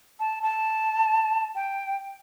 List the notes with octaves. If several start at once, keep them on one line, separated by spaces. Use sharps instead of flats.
A5
A5
G5